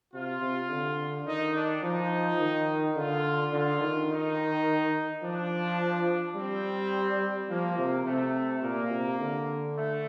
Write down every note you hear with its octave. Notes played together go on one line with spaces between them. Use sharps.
C3 F4
C3
D3
D#3 D#4
D4
F3 D#4
D#3
D3 F4
D3 F4
D#3
D#4
F3 D4
G3 C4
F3 A#3
C3
C3 A3
A#2 A#3
C3
D3
A3